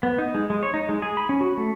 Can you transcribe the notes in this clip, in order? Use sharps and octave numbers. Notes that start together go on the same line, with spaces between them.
B3
D#4
G#3
G#3
C#5
D#4
G#3
G#4
B5
C#4
F#4
A3